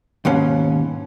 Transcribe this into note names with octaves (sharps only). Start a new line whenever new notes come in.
D#2 G#2 B2 C#4